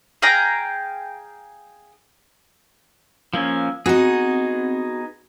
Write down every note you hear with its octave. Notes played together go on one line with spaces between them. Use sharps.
G#4 F5 G5 A#5
F3 A#3 C#4 F5 E6
B3 C4 D#4 F#4 G#4 D#5